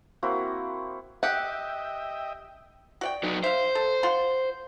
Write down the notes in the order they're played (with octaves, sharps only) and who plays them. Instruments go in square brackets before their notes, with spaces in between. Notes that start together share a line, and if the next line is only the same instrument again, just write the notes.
[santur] A#3 C4 E4 F#4
[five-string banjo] G4 F#5 [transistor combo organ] D#5 E5 G5
[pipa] F#4 D5 G5
[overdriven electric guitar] F#3 D#4
[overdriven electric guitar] C5 [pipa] E5 F5
[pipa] A4
F4 F#5 C6